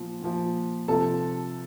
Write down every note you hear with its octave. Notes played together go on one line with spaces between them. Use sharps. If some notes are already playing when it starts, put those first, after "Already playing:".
Already playing: A#2 F3
A#2 F3
C3 F3 A4 A5